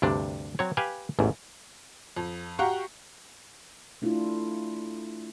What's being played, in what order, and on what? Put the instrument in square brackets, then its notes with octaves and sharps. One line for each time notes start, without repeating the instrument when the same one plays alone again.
[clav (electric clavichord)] D2 G2 C3 D4
F#3 C4 C#5
G4 B4 F5 G#5
A1 E2 G#2
[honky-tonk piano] F2
F#4 G4 F5 F#5 A#5 C#6
[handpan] A3 D4 E4 F4